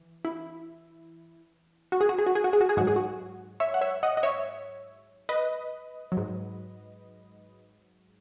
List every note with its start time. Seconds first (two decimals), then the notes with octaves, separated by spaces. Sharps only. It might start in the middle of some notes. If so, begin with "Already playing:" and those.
Already playing: E3
0.25 E4
1.92 F#4
2.01 G#4
2.09 F#4
2.18 G#4
2.27 F#4
2.35 G#4
2.44 F#4
2.53 G#4
2.61 F#4
2.69 G#4
2.77 G#2 F#3 F#4
2.87 G#4
2.96 F#4
3.60 C#5 E5
3.74 F#5
3.81 C#5 E5
4.03 D#5 F#5
4.17 D#5
4.23 C#5 E5
5.29 B4 D#5
6.12 F#3
6.17 G#2